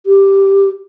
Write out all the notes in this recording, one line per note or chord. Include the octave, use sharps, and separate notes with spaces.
G4